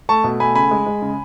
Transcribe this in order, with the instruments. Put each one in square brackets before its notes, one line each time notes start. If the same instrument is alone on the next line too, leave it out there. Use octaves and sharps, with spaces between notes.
[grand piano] A3 A5 C#6
B2
A3 G#5 B5
C#3 G#5 B5
G#3
G#3
C#3